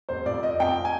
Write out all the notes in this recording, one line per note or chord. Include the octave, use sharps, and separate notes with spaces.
F1 C5
F2 D5
F1 D#5
F2 G5
G#5